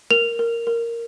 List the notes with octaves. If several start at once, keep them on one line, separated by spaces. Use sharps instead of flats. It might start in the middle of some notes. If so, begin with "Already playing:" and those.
A#4 F7
A#4
A#4